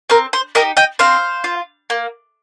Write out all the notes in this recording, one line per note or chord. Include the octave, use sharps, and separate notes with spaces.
C4 A#4
C5
D#4 G4 A#4 D#5
D#5 G5
C4 C5 F5
F4
A#3